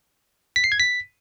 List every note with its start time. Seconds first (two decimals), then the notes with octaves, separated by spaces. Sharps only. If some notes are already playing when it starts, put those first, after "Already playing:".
0.56 B6
0.64 C7
0.72 G#6
0.80 B6